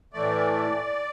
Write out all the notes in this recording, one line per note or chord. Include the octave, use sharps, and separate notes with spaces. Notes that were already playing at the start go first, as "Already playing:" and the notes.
A2 E3 A3 D5